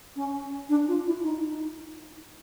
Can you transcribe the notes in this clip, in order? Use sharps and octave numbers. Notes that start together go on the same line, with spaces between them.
C#4
D4
F4
E4
D#4